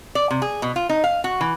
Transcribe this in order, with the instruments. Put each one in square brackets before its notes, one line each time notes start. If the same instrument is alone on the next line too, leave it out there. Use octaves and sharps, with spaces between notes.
[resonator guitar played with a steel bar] D5
C3
G#4
B2
F4
D#4
F5
F#4
E3